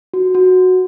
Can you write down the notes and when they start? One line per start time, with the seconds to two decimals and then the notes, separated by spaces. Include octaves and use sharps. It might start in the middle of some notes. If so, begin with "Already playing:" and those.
0.14 F#4
0.35 F#4